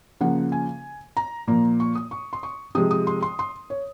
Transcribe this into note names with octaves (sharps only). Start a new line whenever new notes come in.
C#3 F3 A#3 F#5
G#5
A#5
A#2 F3 A#3
C#6
D#6
C#6
C6
C#6
C3 F3 G#3 D#6
D#6
C6
C6
C6
C#5